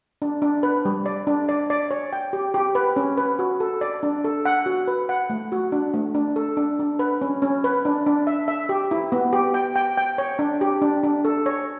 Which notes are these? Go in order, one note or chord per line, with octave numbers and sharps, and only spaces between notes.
D4
D4
B4
G3
D5
D4
D5
D5
C#5
G5
G4
G4
B4
C#4
B4
F#4
A4
D5
D4
A4
F#5
F#4
B4
F#5
A3
F#4
D4
A3
D4
A4
D4
D4
B4
C#4
C#4
B4
D4
D4
E5
E5
G4
E4
B3
G4
G5
G5
G5
C#5
D4
G4
D4
D4
A4
C#5